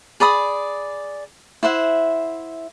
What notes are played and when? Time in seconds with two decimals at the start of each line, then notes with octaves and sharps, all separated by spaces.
0.20 G#4 D5 B5 D#6
1.63 E4 C5 E5 F#5